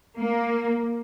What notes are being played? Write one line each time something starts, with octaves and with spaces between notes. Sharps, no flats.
A#3